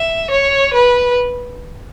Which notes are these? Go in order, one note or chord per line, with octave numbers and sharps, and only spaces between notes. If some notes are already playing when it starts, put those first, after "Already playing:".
Already playing: E5
C#5
B4